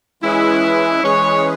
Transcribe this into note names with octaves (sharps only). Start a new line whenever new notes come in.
E3 G#3 C#4 E4 G#4 B4
E3 G#3 C#4 G#4 B4 C#5